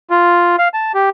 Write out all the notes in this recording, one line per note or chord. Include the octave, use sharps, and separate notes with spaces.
F4
F5
A5
G4